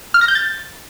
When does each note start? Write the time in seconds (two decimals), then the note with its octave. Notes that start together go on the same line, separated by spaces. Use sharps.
0.14 F6
0.21 A#6
0.28 G6
0.35 A6